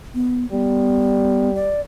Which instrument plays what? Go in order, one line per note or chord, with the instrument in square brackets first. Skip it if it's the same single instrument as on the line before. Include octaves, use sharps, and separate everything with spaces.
[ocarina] B3
[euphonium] G3 [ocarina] B3
[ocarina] D5